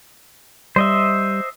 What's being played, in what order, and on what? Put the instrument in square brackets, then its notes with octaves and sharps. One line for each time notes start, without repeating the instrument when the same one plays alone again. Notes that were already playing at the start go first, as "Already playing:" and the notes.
[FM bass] G3 [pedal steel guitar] C5 D#5 E5